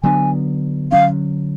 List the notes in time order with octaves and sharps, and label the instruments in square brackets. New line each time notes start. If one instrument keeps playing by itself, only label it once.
[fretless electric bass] D3 F#3 B3 D4 [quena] G#5
[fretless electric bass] D3 F#3 C#4 [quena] F5